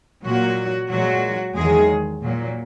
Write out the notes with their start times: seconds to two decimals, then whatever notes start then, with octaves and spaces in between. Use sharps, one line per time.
0.24 A#2 F#3 A#3 F#4
0.90 A#2 F#3 G#3 F#4
1.56 E2 D#3 F#3 G#3 G#4
2.22 A#2 F#3 A#3